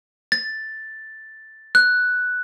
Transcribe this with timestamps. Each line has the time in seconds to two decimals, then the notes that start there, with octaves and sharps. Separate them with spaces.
0.32 A6
1.75 F#6